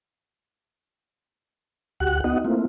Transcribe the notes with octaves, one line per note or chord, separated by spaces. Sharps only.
D2 F#4 G4 F#5 F#6
B3 D#4 F#4 D#5 F#5
A3 A#3 C4 E4 F4